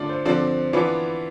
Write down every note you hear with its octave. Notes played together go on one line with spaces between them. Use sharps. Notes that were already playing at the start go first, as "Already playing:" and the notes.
Already playing: D3 A3 D4 F4 D5
C5
D3 F3 C4 D5
E3 B3 D4 F4